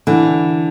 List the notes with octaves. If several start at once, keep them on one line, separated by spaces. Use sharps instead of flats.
D3 E3